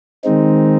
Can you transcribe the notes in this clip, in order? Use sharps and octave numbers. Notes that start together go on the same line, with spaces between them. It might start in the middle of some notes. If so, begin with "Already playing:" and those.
D#3 G#3 C4 D#4